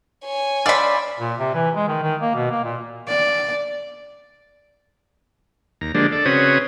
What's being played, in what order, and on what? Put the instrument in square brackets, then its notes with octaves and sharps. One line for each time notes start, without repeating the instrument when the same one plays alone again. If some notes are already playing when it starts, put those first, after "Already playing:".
[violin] C#5 G#5
[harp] C5 E5 F5 [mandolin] D5 B5
[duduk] A#2
C3
E3
G#3
D#3
D#3
A#3
B2
A#3
A#2
[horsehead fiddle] D5
[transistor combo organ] D#2 A#5
D3 F3 G#3 A#3 D4 G4
A4 D5
C#3 C4 C#4 F#4 B4 D#6